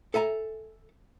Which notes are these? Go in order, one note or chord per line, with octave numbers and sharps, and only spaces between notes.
A4 E5 G#5 A#5